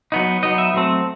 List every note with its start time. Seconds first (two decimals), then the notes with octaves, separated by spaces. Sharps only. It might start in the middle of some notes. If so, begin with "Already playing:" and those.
0.12 F#3 B3 D#4
0.43 F#3 B3 D#4 D#5
0.58 E5
0.74 F#3 A3 C4